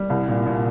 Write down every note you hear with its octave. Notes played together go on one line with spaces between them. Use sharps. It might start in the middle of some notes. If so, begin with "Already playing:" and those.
Already playing: G3
C2
A#2
A#2